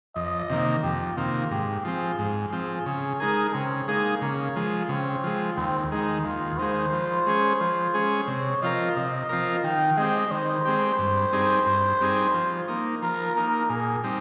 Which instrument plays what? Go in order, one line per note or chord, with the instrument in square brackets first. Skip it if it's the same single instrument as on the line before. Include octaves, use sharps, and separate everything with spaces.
[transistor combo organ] F2 [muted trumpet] D#5
[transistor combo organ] C3 D#3 A#3
[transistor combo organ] F2 [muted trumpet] G4
[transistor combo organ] C3 D#3 A#3 [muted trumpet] F4
[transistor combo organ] G#2 [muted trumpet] G4
[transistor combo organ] F3 C4 [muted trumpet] G#4
[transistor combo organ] G#2 [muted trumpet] G#4
[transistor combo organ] F3 C4 [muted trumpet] G#4
[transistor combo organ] C#3 [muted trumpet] G#4
[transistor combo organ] G#3 D#4 G#4 [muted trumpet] A#4
[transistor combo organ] C#3 [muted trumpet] C4
[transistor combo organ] G#3 D#4 G#4 [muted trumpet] A#3
[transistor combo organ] C#3 [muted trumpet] A#3
[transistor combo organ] F3 G#3
[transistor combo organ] C#3 [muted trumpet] C4
[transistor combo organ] F3 G#3
[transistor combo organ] D#2 [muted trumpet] C4
[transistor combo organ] D#3 G#3 [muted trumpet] D#4
[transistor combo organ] D#2 [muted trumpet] F4
[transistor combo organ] D#3 G#3 [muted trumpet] C5
[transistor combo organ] F3
G#3 C#4 G#4
F3
G#3 C#4 G#4
[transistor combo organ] C3 [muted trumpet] C#5
[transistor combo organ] F3 C4 F4 A#4 [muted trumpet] D#5
[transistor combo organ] C3 [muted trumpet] D#5
[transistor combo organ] F3 C4 F4 A#4
[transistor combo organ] D#3 [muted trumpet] G5
[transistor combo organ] G#3 C4 G4 [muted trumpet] D#5
[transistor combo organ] D#3 [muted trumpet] C5
[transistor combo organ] G#3 C4 G4
G2
G3 C4 D#4 G#4
G2
G3 C4 D#4 G#4
F3
A#3 D#4
[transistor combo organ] F3 [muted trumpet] A#4
[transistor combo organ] A#3 D#4 [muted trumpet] A#4
[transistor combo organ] A#2 [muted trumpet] G#4
[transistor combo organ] G3 C4 D#4